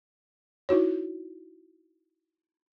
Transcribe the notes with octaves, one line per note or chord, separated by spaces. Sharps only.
D#4 E4 F#4 C#5